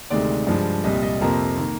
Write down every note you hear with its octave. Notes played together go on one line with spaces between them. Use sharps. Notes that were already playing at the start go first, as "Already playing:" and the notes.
D2 C3 D#3 G#3 D5
G2 F3 G#3
C2 A#2 G3 D#5
D#5
F2 C3 F3 A#3 A#5
D#3 A#3